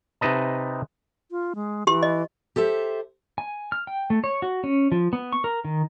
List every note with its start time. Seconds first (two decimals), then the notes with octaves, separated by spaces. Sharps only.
0.21 C3 D#4 B4 D#5 A5
1.31 F4
1.55 G#3
1.87 E3 G4 C6
2.03 D#5
2.56 G4 A4 C5 E5
3.38 G#5
3.72 F6
3.87 G5
4.10 A3
4.24 C#5
4.42 F#4
4.64 C#4
4.92 F3
5.13 B3
5.32 C#6
5.44 A#4
5.65 D#3